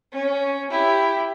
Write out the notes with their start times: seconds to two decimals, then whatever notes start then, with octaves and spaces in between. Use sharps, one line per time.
0.12 C#4
0.70 E4 G4